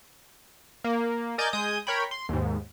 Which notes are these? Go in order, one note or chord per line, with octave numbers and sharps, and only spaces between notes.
A#3
A#4 D5 D#5 G#5 G6 A6
G#3 G#5 D#6 G6
A#4 C#5 G5 B5
C6
D#2 G#2